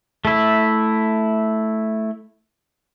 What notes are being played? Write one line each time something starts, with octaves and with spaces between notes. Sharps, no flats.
A3 E4